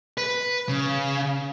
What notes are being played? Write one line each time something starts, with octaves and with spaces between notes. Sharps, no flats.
B4
C#3